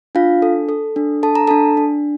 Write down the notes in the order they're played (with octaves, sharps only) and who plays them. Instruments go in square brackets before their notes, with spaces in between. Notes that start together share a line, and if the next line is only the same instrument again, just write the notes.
[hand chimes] D4 F4 F5
A4
A4
D4
A4 A5
A#5
D4 A4 A5
D4